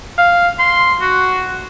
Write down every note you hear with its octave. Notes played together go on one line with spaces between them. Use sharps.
F5
C6
F#4